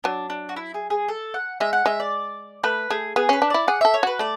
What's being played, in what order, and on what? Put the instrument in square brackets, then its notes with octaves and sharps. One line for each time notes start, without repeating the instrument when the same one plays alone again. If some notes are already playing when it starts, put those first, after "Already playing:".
[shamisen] F#3 [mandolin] D4
[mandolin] D4
F#4
E4
G#4
G#4
A4
F#5
[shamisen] G#3 [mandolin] E5
[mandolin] F#5
[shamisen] G#3 [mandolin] E5
[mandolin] D5
[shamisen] A3 [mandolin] B4
[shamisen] A3 [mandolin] G#4
[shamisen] B3 [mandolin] G#4
[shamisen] C#4 [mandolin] B4
[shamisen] D4
[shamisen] E4 [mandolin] D5
[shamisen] G#4 [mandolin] F#5
[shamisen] A4 [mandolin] E5
[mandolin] C#5
[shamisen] F#4 [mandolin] B4
[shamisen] A3 [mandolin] D5